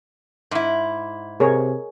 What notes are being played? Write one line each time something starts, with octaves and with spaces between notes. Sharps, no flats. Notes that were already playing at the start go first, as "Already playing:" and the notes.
G#2 E4
C3 G#4 A#4 C#5